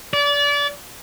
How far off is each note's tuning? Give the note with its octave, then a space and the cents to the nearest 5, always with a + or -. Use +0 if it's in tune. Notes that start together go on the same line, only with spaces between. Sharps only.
D5 -30